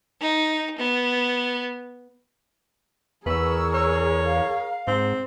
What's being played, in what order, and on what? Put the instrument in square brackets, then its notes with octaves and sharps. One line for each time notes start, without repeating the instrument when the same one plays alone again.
[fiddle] D#4
B3
[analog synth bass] E2 [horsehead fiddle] G#4 A#4 [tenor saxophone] B4 [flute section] C#6 E6
[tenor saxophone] C#5
[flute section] F5
[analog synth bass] G#2 [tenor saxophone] C4